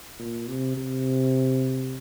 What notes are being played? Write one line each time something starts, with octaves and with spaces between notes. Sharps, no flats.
A#2
C3
C3